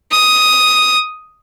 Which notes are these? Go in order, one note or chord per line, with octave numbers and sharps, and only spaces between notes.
D#6